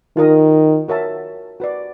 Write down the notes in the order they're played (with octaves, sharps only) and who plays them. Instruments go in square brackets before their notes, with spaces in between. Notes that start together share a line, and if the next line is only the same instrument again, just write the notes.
[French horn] D#3 [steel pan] F4 A#4 D#5
[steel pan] F#4 A#4 C#5 E5 A5
F#4 B4 D5